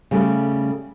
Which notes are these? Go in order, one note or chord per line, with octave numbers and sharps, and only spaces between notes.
C#3 G3 A3